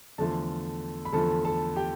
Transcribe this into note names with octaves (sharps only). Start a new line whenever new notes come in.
E2 D3 F3 A3 A4 A5
B5
E2 D3 F3 A3 A4 A5
A4 A5
G4 G5